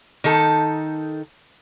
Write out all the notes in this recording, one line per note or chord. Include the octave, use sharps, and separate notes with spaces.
D#3 D#4 A4